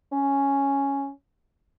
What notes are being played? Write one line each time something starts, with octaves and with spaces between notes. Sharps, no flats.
C#4